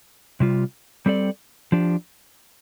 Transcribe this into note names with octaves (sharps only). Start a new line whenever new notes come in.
C3 G3 F4
G3 C4 A4 D5
F3 D4 G4